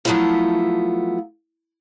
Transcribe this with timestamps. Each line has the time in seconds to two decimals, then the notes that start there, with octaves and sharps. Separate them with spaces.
0.05 F3 F#3 A3 B3 E4 F4